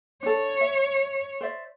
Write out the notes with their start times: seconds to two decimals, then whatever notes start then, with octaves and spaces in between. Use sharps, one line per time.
0.23 D4 A4 C#5
0.61 E5
1.41 C5 D5 E5